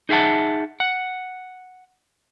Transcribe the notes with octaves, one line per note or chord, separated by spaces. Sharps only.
D#4 G#4 E5 F#5 A5
F#5